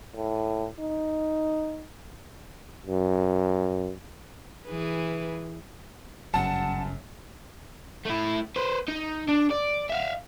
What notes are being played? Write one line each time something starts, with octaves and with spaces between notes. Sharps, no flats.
A2
D#4
F#2
E3 G#4 B4
G1 F#2 C#3 F#5 A5
A3 E4
B4 C5
D#4
D4
D5
E5 F5